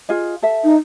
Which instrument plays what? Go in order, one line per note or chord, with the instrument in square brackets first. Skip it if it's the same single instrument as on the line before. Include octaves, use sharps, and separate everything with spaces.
[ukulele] F4 G#4 D#5
A4 E5
[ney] D#4